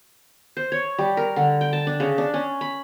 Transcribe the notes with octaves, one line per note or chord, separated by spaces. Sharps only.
C5
C#5
G3
A#4
D3
G5
A5
D4
C#3
D4
C#4
B5